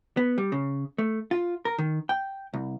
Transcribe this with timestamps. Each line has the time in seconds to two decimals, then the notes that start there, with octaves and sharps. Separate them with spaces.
0.17 B3
0.38 G3
0.52 C#3
0.98 A3
1.31 F4
1.65 A#4
1.78 D#3
2.09 G5
2.53 C2